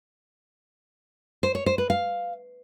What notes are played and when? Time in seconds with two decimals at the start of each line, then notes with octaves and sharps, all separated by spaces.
1.43 C5
1.55 C#5
1.66 C5
1.78 B4
1.90 F5